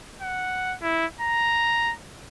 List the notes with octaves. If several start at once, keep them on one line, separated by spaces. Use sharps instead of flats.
F#5
E4
A#5